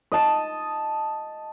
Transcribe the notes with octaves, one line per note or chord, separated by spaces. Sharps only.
D#5 A5